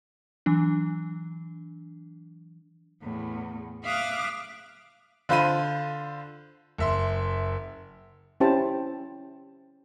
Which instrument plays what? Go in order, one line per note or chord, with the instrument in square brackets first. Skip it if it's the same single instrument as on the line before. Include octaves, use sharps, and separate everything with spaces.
[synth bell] E3 F#3 D4
[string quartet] E2 A2
E5 F5 D6 D#6 F6 F#6
[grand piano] D3 F4 C5 B5 C6 D#7
F#1 E5 C6
[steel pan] C#4 E4 G4 C5 G5 A5